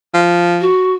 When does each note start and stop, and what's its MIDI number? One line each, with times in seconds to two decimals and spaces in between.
0.14 0.68 53
0.61 0.95 66